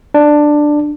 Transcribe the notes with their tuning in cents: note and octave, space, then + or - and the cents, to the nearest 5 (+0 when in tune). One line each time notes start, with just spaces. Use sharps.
D4 +10